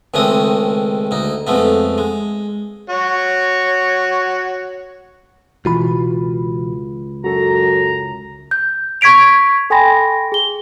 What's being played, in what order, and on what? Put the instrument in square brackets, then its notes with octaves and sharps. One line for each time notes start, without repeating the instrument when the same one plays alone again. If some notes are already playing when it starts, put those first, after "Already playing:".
[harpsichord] C#2 D#3 G#3 A3 C4 D#6
D2 D#4
F2 G#3 A3 B3
G#3
[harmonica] F#4 C#5
[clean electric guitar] C#2 F4 B5 [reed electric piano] B2 E3 F#4
[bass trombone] F#2 [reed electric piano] F#4 A4 [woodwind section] A#5
[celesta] G6
C#6 G#6 B6 D7 F7
A4 G5 G#5 B5 C6 A#6
G#4 G7